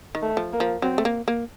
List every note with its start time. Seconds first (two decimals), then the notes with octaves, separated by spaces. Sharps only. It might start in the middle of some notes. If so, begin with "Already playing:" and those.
0.15 D#3
0.22 A3
0.37 F3
0.52 A#3
0.60 F3
0.82 F#3 C4
0.98 A3
1.05 A#3
1.28 A#3